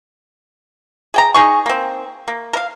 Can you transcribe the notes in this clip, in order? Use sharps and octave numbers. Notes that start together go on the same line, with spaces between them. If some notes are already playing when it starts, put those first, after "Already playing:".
G#4 G5 A#5
D#4 G#4 C#6
A#3 C4
A#3
A#4 F5